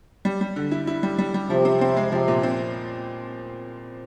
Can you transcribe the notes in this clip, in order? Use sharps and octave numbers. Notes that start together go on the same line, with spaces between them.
G3
G3
D3
E4
E4
G3
G3
G3
C3 F3
C4
C4
G#3
C3 F3
A#2
C4